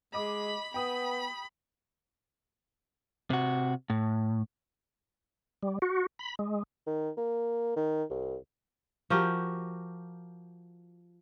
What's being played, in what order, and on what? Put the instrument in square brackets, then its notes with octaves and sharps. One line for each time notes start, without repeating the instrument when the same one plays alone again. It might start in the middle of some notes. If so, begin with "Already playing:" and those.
[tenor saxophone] G#3 [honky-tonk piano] D#5 D6 [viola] B5
[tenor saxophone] B3 [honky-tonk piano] G5 D#6 [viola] B5
[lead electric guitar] C3 F#4
A2
[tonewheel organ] G3
F#4
B5
G#3
[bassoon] D#3
A#3
D#3
C2
[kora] F3 F#4 G4 A#4